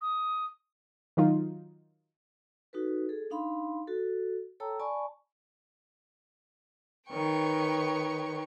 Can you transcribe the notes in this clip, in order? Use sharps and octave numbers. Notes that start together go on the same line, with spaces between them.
D#6
D#3 F#3 D#4 F4
D#4 F#4 A4 B4
G#4 A4
D4 D#4 F5 B5 C6
F#4 A4
A4 C#5 G5 A5 A#5 E6
D5 G#5 A5 B5 C#6
D#3 B4 C#5 G5 C#6